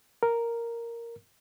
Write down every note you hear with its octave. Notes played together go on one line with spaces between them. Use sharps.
A#4